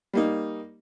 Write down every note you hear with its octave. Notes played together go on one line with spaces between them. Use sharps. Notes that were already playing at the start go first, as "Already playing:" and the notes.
G3 A#3 D#4